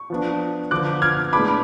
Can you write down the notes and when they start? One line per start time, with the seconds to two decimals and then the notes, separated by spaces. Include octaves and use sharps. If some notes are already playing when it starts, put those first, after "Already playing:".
Already playing: C#6
0.10 F3 B3 D4
0.71 D3 F3 B3 D6 F#6
1.02 F6 G#6
1.33 A2 G#3 B3 D4 B5 D6